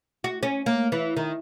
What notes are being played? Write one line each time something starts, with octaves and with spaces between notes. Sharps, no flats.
F#4
C#4
A#3
E3
D#3